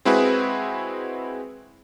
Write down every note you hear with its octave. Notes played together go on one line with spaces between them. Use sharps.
G#3 C4 E4 F#4 G#4 B4